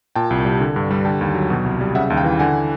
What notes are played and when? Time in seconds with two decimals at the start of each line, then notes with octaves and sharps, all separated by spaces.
0.15 A#2 G5 A5
0.31 C2
0.45 G3
0.60 D3
0.76 G2
0.91 G3
1.05 D3 G5 A5
1.21 D#2
1.35 F#3
1.50 B2
1.64 C2
1.81 G3
1.95 C#3 E5 F#5
2.10 D#2
2.17 F5 G5
2.24 E3
2.39 D3 F#5 G#5